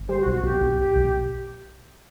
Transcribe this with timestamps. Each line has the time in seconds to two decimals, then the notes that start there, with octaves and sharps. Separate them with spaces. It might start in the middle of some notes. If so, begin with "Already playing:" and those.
Already playing: G1
0.08 G3 C5
0.20 F#4
0.26 B1
0.32 F#4
0.43 B1 G4
0.61 B1
0.79 B1 G4
0.96 B1